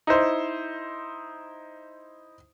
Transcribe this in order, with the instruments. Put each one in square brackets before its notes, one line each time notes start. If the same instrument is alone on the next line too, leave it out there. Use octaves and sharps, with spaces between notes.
[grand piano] D#4 E4 C5